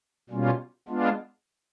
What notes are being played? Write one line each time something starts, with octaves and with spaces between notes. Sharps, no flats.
B2 G3 A#3 C#4 F4
G#3 B3 D4 F4